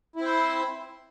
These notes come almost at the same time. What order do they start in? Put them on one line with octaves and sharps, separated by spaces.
E4 C4 C5